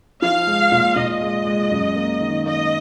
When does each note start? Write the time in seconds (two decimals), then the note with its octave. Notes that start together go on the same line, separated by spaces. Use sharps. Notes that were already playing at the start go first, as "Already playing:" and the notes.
0.22 F3 F5
0.47 G#3
0.72 A#2
0.96 A#2 D#5
1.22 G#3
1.47 G#3
1.71 F#2
1.96 A#3
2.21 D#3
2.46 A#3 D#5